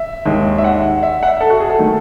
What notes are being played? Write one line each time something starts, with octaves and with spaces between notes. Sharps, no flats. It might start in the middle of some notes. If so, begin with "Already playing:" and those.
Already playing: E5
D#2 D#3 G#3
E5
F#5
E5
F#5
E5
A4
F#4
G#4
A4
D#3 A3